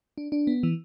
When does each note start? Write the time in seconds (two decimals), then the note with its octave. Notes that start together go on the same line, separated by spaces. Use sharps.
0.18 D4
0.32 D4
0.47 B3
0.63 E3